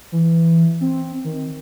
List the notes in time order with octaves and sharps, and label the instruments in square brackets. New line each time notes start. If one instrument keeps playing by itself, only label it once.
[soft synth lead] E3
C4
D#3